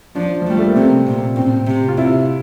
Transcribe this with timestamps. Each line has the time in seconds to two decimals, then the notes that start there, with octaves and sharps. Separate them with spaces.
0.15 F3 D4
0.42 F3
0.46 G3 A3
0.59 A3
0.68 A#3
0.76 C3 C4
1.07 A#2
1.36 A2 C4
1.67 C3
1.88 F4
1.98 C3 E4